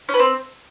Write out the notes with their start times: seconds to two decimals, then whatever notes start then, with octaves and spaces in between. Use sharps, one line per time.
0.09 C#4
0.14 B4
0.19 C4